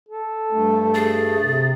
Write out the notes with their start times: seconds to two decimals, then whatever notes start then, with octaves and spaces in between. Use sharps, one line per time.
0.09 A4
0.52 G2 A3
0.95 G#4 A6
1.40 C3